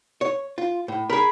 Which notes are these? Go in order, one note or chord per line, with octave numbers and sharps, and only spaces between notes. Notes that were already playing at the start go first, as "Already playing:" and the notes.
C#5
F4
A2
G#4 A#4 B5